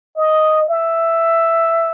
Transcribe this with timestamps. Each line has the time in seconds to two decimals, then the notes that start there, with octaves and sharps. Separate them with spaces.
0.17 D#5
0.69 E5